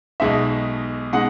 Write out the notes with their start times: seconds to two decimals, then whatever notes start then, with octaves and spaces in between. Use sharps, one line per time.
0.20 B1 B2 G#3 D#4 E5
1.13 B2 G#3 D#4 F#5